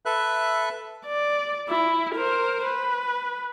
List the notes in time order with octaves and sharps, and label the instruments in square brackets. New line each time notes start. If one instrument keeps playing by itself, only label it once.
[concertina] A4 B4 E5 F#6
[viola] D5
E4
A#4 C5
B4